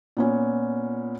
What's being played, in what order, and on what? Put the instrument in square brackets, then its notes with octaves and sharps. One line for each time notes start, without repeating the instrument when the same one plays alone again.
[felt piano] A#2 B3 C#4